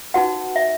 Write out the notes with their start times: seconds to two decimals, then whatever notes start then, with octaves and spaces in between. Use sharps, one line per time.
0.14 D#4 F#4 B4 F#5
0.56 E5